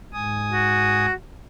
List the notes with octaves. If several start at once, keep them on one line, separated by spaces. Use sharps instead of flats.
G#2 G#5 D#6
F#4